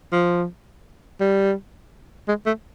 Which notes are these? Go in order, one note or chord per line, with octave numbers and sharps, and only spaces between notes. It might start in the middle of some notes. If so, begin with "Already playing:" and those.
F3
G3
G#3
A3